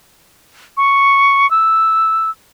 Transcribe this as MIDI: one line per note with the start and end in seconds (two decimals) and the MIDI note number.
0.77 1.49 85
1.51 2.30 88